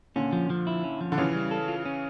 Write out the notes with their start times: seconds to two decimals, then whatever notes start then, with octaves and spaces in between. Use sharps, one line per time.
0.16 A#2 D3 C#4
0.32 F3
0.50 F3
0.67 E4
0.84 C#4
1.01 F3
1.12 D3
1.18 C#3 E3 C#4
1.34 G3
1.51 A4
1.68 F4
1.85 C#4